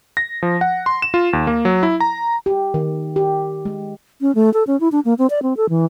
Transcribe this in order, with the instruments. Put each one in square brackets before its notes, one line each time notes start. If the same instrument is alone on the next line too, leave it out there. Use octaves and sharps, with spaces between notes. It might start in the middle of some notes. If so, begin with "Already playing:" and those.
[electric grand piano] A#6
F3
F#5
C6
E7
F4
D#2
A#3
F#3
E4
A#5
[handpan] G4
D#3
G4
G#3
[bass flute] C#4
A3
A4
C#4
E4
D4
A#3
C4
D5
C4
A4
E3